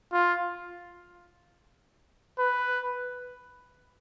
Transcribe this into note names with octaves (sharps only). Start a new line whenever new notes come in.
F4
B4